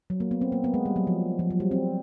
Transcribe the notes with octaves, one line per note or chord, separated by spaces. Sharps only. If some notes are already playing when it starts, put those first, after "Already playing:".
F#3
A#3
B3
C4
A#3
B3
G#3
G3
F#3
F3
F3
F#3
G3
C4